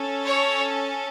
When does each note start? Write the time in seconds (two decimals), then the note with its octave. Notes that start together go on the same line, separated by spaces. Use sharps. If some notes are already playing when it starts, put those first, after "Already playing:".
Already playing: C#4 A4
0.24 C#5